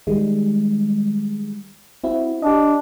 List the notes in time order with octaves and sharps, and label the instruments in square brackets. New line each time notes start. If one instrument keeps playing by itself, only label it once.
[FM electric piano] D#3 G3 G#3
C4 E4 F#4
[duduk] D4 [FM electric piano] G4 D#5